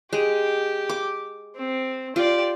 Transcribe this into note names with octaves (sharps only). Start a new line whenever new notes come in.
G#3 G4
D6
C4
F4 G4 D5